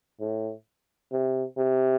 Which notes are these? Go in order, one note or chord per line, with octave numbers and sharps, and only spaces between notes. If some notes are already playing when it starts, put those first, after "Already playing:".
A2
C3
C3